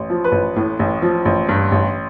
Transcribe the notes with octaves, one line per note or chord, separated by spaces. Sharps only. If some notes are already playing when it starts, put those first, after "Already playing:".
Already playing: A1
F3
B4
A1
A2
A1
F3
A1
G2
A1